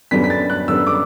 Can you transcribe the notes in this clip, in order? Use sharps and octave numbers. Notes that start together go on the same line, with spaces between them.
F#2 D3 G3 B3 B6
B6
A6
F#6
F#2 D3 G3 B3 E6
D6